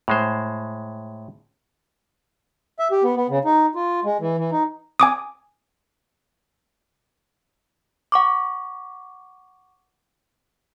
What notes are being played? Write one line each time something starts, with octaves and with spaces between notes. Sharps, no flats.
A2 G#3 C5
E5
G4
B3
B3
C#3
D#4
F4
G#3
E3
E3
D#4
G#5 D6 D#6
F#5 C#6 D6